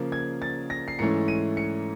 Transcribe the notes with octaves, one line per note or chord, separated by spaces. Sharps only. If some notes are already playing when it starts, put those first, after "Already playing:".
Already playing: C#3 F3 A#3
G#6
A6
A#6
C7
G#2 E3 A3 C#4 E4 C#7
D#7
C#7